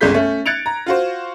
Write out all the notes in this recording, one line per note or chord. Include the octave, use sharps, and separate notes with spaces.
G1 C2 C#3 G#3 G6 B6
A3 C#4
F#6 G#6 A6 C#7 D7 F7
A#5
F4 F#4 C5